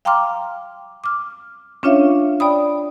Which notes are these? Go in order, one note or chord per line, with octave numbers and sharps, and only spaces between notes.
F5 G5 A#5 C6 D6 F6
D6 F6
C#4 D4 F4 C#5 E5 F5
D5 G5 B5 D#6